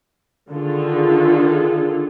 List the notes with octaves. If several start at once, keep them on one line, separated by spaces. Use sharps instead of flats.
D3 D#3 F4 G#4 A4